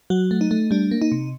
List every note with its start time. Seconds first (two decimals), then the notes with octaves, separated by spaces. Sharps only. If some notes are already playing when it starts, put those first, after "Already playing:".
0.10 F#3 F#4
0.31 A3
0.41 D#4
0.51 A3
0.71 G3 D4
0.91 A#3
1.02 D#4
1.12 C3